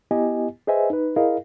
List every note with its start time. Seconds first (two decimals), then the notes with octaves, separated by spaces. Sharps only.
0.11 B3 E4 G4 D#5 G#5
0.67 G#4 B4 C5 D#5 E5 G#5
0.90 D#4 B4
1.16 E4 G#4 A#4 D#5 F5